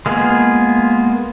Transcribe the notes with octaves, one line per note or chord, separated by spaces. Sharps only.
G#3 A#3 B3 F4 G#4